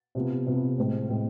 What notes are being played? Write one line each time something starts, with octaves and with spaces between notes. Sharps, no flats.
C3 F3 B3
C3 F3 B3
A2 G#3 C4
A2 G#3 C4